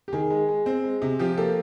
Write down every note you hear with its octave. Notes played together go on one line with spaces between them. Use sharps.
G4
D#3 G#4
G#3
G#3
C4
G#3
C3
F3 G4
A#3 G4 A4